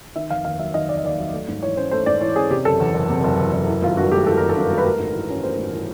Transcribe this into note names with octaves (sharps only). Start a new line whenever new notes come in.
D#3 E5
F1 F5
D#2 F5
F#3 E5
D#3 D#5
F1 D5
D#5
D#2 D5
F#3
A3
G#2
E3 C#5
C#4 C5
A3 C5
G#2 D5
E3 C#5
C#4 G#4
C3 G4
F#1 A4
E2
F#1
C3
F#1
E2
F#1
E3
G#1 F4
G2 F#4
A3 G4
E3 A4
G#1 A#4
A4
G2
A3
B4
A3 A#4
G#2
E3
C#4
A3 C5
G#2
E3